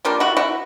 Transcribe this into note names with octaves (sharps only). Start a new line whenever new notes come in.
G3 A#3 D4 F4
E4 F#4
E4 F#4